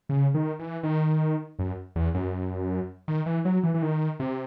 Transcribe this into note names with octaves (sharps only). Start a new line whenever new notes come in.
C#3
D#3
E3
D#3
F#2
E2
F#2
D#3
E3
F#3
E3
E3
D#3
C3